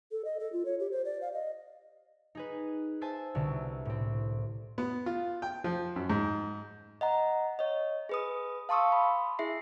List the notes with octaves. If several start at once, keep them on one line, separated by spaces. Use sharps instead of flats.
A4
D#5
A4
F4
C#5
G4
C5
D5
F5
D#5
D#4 G#4 B4
C5 E5 G#5 A5
C2 B2 D3
A2 C4
B3
F4
G5
F3
F#2
G#2
D#5 F#5 A#5
C#5 D#5
G#4 B4 D#6
F5 A5 C6 C#6 D#6 E6
B5
E4 G#4 E5 C7